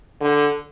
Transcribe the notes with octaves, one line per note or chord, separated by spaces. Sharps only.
D3